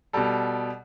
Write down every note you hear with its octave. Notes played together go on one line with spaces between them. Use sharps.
B2 G3 A4